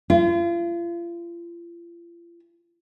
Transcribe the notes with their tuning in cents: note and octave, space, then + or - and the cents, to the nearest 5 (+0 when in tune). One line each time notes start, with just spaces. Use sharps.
F4 -40